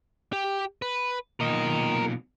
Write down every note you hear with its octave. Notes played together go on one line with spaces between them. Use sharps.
G4
B4
B1 A#2 A#4 D#5